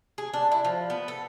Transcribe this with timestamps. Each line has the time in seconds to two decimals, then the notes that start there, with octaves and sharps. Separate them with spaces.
0.18 G#4
0.33 D4
0.52 E4
0.65 F3
0.90 B3
1.08 A4